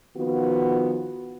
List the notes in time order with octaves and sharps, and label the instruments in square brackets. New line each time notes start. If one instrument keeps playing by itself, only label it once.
[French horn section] D#3 F3 B3 F4 F#4